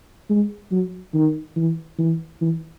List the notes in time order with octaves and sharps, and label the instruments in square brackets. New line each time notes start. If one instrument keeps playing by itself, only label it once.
[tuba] G#3
F#3
D#3
E3
E3
E3